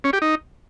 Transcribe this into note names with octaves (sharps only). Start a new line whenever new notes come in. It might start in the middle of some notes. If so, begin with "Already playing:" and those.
C#4
G4
D#4